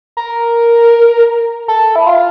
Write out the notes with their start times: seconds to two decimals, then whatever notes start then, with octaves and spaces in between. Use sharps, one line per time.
0.17 A#4
1.68 A4
1.96 E4
2.06 F4